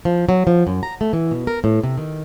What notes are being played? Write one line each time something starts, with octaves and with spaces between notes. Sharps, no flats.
F3
F#3
F3
F#2
A#5
A3
E3
B2
A#4
A2
C3
D#3